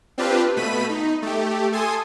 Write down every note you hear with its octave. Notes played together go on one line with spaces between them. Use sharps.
C4 D4 F4 G4 B4
B2 A3 B5 B6 D#7
D#4
A3 G4
A4 G#5 C6 D#6